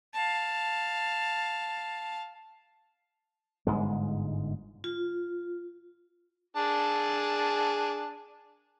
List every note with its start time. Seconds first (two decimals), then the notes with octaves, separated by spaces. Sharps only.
0.14 F5 A5
3.67 G1 G#2 G#3
4.84 F4
6.57 D4 G#4 A5